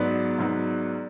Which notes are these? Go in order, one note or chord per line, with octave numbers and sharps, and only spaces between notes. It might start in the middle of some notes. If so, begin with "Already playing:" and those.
Already playing: G#2 F#3 B3 D5
G#2 F#3 B3